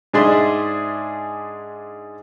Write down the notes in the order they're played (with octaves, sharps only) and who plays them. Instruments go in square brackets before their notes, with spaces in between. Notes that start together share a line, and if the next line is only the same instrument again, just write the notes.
[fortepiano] G#2 D4 G#4 D5 E5 C6